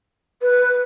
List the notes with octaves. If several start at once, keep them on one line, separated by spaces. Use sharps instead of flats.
B4